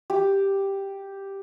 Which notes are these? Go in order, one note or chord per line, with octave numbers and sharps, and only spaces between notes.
G4